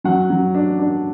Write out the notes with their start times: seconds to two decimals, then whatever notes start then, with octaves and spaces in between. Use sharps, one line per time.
0.04 F#3 F#5
0.30 F#3
0.55 D4
0.79 D4